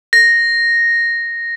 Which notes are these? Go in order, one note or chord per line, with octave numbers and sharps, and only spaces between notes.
A#6